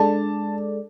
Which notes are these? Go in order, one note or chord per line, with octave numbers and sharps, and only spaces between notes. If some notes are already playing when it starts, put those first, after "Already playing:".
Already playing: G#3 D4 A4 D5 A5